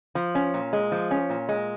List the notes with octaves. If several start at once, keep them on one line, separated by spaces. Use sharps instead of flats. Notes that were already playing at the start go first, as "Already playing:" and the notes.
F3
C#4
A#2
G#3
F3
C#4
A#2
G#3